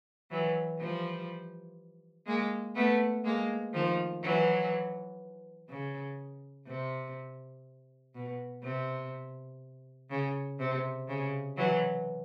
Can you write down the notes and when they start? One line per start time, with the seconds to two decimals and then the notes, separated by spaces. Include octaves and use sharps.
0.31 E3 F#3
0.80 F3 G3
2.27 G#3 A#3
2.75 A3 B3
3.24 G#3 A#3
3.74 D#3 F3
4.22 E3 F#3
5.69 C#3
6.67 C3
8.15 B2
8.63 C3
10.10 C#3
10.60 C3
11.08 C#3
11.57 E3 F#3